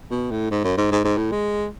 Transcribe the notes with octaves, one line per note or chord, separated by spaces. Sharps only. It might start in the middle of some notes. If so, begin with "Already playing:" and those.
B2
A2
G#2
F#2
G#2
G#2
G#2
A2
G#3